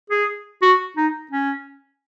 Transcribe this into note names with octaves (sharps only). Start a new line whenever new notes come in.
G#4
F#4
D#4
C#4